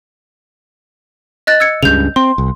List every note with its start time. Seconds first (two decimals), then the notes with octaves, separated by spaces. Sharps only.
1.47 D#5 F#6 A6
1.60 E6 G#6 C#7
1.83 C#2 G2 C#3 G6 F7
2.16 C4 C6
2.38 C2